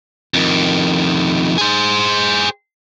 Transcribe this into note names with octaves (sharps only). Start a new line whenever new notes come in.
F2 D#3
G#4 C5